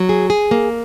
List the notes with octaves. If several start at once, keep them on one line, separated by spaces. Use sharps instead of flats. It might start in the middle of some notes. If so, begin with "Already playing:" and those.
Already playing: F#3
G#4
G#4
A#3